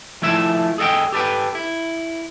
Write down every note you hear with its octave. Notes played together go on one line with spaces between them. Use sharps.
F3 A3 E4 E5
G#4 A4 D#5 F#5 G5
G4 A4 B4 G5
E4